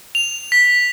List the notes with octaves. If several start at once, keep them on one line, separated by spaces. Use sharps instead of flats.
F7
B6